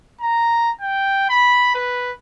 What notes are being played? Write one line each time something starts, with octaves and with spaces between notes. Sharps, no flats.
A#5
G5
B5
B4